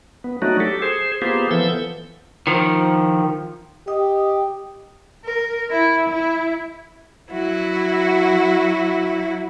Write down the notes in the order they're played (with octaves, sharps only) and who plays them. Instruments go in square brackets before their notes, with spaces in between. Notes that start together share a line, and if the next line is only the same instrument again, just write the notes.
[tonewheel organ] B3
F#3 A3 D4 D#4 F#4
G4 A4
G#4 C5
A#3 B3 F4 G4 G#4 C5
E3 F3 B3 A4 E6 G6
[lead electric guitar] D#3 F3
[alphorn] G4 [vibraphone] D#5 G5 D#6
[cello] A#4
E4
E4
[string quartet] F#3 E4 F#4